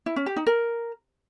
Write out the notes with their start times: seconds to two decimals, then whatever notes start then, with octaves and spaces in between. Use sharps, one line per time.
0.06 E4
0.16 C#4
0.26 G4
0.36 D#4
0.47 A#4